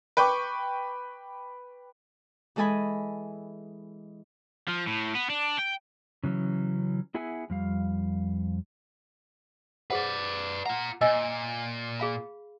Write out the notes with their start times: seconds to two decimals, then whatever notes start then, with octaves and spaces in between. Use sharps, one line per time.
0.17 B4 G5 C#6 D6
2.56 E3 G#3 A4 D#5 G#5 B5
4.68 F3
4.87 A2
5.15 B3
5.30 D4
5.59 G5
6.24 C#3 E3 F#3 C#4
7.14 B3 E4 G#4 E5 F#5 G#5
7.50 F2 G3 F5
9.90 G#4 B4 C5 D5 F#5
10.66 F4 F#5 A#5
11.01 A#2 D#5 G#5 E6
12.00 G#4 F5 B5